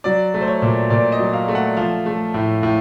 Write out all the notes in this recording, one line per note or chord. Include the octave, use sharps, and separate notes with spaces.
F#3 D5
A3
C5
C#5
A#2
A#2 D5
D#5
F#3
F5
A3
F#5
F3 F5
A3
A2
A2